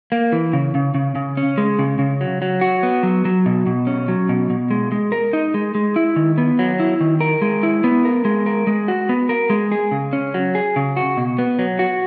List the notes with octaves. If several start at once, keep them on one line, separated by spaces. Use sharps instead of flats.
A#3
E3
C#3
C#3
C#3
C#3
C#4
G#3
C#3
C#3
F#3
F#3
F#4
B3
F#3
F#3
B2
B2
C#4
F#3
B2
B2
G#3
G#3
A#4
D#4
G#3
G#3
E4
D#3
B3
F#3
E4
D#3
A#4
G#3
E4
B3
A#4
G#3
A#4
G#3
F#4
B3
A#4
G#3
G#4
C#3
C#4
F#3
G#4
C#3
F#4
B2
B3
F#3
F#4